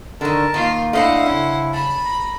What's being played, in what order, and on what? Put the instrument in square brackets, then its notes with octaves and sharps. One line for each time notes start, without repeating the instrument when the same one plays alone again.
[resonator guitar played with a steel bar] D3 D#3 [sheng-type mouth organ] A#4 A5
[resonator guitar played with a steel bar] D#3 [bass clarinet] A#3 [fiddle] F4
[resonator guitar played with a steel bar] A3 D4 E4 [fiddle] C5 F#5 [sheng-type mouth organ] D#5 F5
[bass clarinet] C#3 [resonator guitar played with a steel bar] C#4 [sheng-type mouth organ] E4
[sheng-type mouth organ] A5 [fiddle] B5
[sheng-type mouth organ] A#5